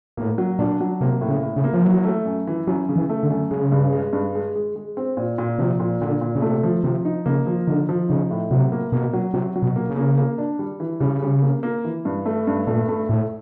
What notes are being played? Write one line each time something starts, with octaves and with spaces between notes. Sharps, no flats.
A2 A#3
F#3
A#2 D4
F#3
C3 A#3
A2
C#3
A2
C#3
A#3
F3
E3 F#3
A3
F#2
E3
F#2 F#3
C#3
E3
A3
D3
F#2
C#3 G#3
G2
G#3
G2
G#3
G#3
G#3
C4
A#2
A#2
C3 F3
A#2
A#2 D3
A#2
C#3
C3 A3
F3
C3 F3
D#4
C#3 A#3
F3
D3 D#4
F3
C#3 D#4
A2
C3 F#3
A#3
B2 A#3
F#3
C3 F#3
F#3
B2
A#3
C#3
A#3
A#3
D4
G3
E3
C#3 G3
G3
A#3
A#3
E3
G2
A3
G2
A#2 A3
A3
A2 A3